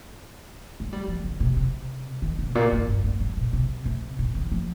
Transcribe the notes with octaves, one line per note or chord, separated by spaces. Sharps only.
G#3
G3
F3
D3
C3
C3
D#3
D3
G#2
A#2
G#2
G2
G2
G#2
A#2
C3
C3
A#2
D#3
F3